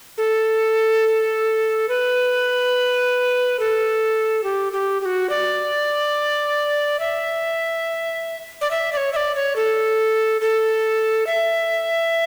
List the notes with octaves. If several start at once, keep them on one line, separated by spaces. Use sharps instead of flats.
A4
B4
A4
G4
G4
G4
F#4
D5
E5
D5
E5
D5
C#5
E5
D5
C#5
A4
A4
E5